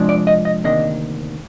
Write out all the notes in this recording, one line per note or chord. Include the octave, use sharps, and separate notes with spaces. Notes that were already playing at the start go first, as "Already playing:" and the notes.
Already playing: C3 F3 G#3 D4
D5
D#5
D#5
D2 C3 D#3 A#3 D4 D#5